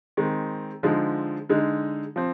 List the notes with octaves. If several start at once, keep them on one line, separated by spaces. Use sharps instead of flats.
D#3 G#3 C4
D3 F3 G#3 D#4
D3 G#3 D#4
F3 C4